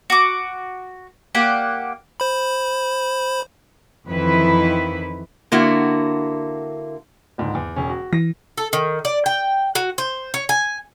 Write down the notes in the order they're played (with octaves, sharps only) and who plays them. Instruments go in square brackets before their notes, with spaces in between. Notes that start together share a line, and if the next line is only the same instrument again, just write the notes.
[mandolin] F#4 D6
A#3 G4 D5 F#5
[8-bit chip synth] C5 B5
[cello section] F2 D#3 E3 E4 B4
[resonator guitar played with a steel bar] D3 A#3 E4 F#4
[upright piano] C#2 G#2 D3
E2
E1 C#4
F#4
[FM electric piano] E3 [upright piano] A#6
[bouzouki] A4
D#3
D5
G5
F#4
C5
C#5
G#5